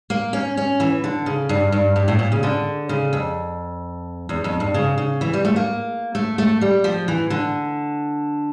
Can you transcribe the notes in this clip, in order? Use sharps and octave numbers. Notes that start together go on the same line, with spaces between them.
A#3
C#4
C#4
E3
D3
C#3
G2
G2
G2
A2
A#2
C#3
D3
C#3
F2
E2
F2
G2
C#3
C#3
E3
G3
A3
A#3
A3
A3
G3
F3
E3
D3